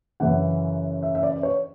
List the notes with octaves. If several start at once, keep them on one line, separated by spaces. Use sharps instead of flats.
F#2 C#3 E3 F#5
E5
E5
D5
C#5